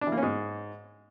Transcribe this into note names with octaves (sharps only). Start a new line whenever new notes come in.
D4
E3
A#3
C#4
G#2